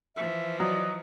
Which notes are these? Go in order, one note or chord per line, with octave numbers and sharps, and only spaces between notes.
E3 F3 E5
F#3 D5 D#5